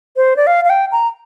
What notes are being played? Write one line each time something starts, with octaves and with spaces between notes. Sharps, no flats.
C5
D5
F5
F5
G5
A#5